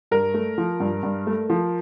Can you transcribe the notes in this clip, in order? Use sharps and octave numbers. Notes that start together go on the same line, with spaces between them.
G2 A#4
A3
F3
G2
G2
A3
F3